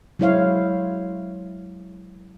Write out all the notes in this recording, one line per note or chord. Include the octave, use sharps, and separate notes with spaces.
F#3 G#3 E4 C5 C#5 F5